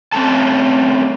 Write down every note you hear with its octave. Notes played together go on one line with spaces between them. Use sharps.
A3 C4 C#4 A4 A5